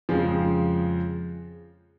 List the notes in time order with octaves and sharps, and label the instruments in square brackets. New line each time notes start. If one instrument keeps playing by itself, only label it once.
[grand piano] F2 C#3 F3 G#3